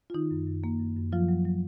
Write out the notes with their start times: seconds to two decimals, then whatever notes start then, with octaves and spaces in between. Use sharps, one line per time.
0.10 F4
0.14 D#3 D#4
0.31 F#2
0.47 F#2
0.64 A#3
0.80 F#2
0.96 F#2
1.12 F3 F#3 F4
1.29 F#3
1.45 F#3